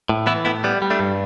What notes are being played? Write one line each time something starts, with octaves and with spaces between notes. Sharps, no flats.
A2
E3 B3 E4
A2 B3 E4
G3 B3
G3
A3 D4
G2